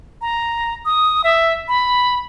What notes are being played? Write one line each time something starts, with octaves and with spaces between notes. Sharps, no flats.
A#5
D#6
E5
B5